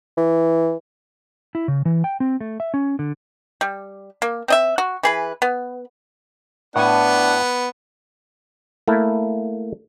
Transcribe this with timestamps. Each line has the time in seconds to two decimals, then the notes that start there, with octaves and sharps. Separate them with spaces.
0.17 E3
1.55 E4
1.68 C#3
1.85 E3
2.04 G5
2.20 C4
2.41 A3
2.60 E5
2.74 C#4
2.99 D3
3.61 G3
4.22 A#3
4.48 C4 D#5 E5
4.78 F#4
5.03 E3 G#4 B4
5.42 B3
6.76 A2 B3 D4 F#5 G#5
8.88 A3 A#3 E4